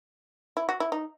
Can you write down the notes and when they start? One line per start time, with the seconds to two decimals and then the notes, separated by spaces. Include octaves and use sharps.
0.57 E4
0.69 F#4
0.80 E4
0.92 D#4